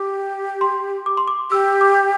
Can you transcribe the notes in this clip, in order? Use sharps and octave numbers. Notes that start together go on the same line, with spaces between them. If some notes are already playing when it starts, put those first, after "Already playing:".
Already playing: G4 D6
C6
D6
C6
D6
G4 E6
D6